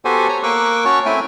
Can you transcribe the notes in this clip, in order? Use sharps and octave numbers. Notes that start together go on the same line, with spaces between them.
B3 F#4 G4 A4 C5 G#5
C#5 G#5 A#5
A#3 A#4 C#6 D6 E6 F#6
C#4 F#4 C#5 A5 C#6
A3 C4 E4 E5 G5 G#5